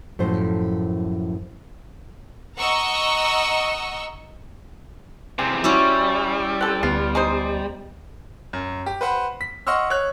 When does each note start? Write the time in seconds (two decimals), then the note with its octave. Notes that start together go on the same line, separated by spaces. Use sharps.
0.19 F#2 A2 F3 C5
2.58 D#5 F#5 A#5 C#6 E6
5.39 E2 C3 C4 G#5
5.64 G3 C#4 E4 F#4 E6
6.61 C4 A4 G5 F#6
6.83 D2 B3 F4
7.15 G#3 D#4 C5
8.53 F#2
8.86 G4
9.01 B4 C5 F#5 B5
9.41 B6
9.67 D#5 F#5 C6 C#6 E6 F6
9.90 C#5 F#6